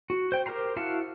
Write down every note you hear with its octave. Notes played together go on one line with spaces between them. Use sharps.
F#4
C5 G5
G4 A#4 C5 A#5 C6
E4 F#4 F5 F#5 A5